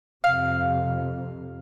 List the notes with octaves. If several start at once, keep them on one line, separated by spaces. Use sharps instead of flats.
F2 C3 F5